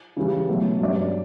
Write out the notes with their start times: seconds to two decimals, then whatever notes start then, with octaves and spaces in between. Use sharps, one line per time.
0.17 C#3 E3 G3
0.48 B2 F#3 A3
0.80 G2 F#3 C#4 G4 D5